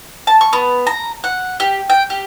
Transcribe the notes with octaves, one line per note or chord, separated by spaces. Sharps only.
A5
C#6
B3
A#5
F#5
G4
G5
G4